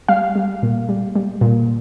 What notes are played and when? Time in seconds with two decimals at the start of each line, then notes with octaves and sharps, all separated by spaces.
0.08 G3 F5
0.36 G3
0.63 A#2
0.89 G3
1.16 G3
1.41 A#2